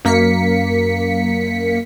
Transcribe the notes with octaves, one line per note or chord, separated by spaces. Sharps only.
F#2 A#3 B6 C#7